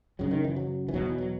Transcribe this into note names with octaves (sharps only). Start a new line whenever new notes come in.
F#2 C#3 F#3
D#3
E3
F#3
E3
E2 B2 F#3
E3
F#3